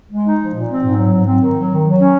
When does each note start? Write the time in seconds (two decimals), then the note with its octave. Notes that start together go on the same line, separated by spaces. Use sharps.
0.11 G#3
0.26 D#4
0.41 F3
0.55 A#2
0.69 C4
0.83 G#2
0.97 F#3
1.13 G#2
1.26 C4
1.42 D#3
1.56 F#3
1.70 D#3
1.85 F#3
2.00 C#4